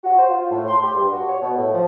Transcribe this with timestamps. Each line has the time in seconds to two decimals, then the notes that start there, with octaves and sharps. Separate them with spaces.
0.04 F#4
0.18 C5
0.29 F4
0.50 A2
0.67 C6
0.83 G4
0.95 G2
1.11 F#4
1.27 C#5
1.41 B2
1.57 A2
1.72 F3